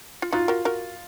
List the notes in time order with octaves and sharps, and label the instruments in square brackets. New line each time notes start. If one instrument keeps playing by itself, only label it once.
[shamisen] F4
[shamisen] D#4 F#4 [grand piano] F4
[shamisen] F#4 A#4
F#4 A#4